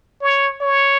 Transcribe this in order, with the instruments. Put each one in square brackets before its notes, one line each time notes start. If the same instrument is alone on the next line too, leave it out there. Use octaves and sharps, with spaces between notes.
[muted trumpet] C#5
C#5